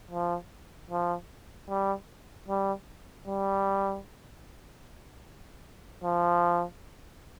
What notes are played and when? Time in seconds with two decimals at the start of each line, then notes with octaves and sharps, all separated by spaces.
0.11 F3
0.90 F3
1.69 G3
2.49 G3
3.27 G3
6.04 F3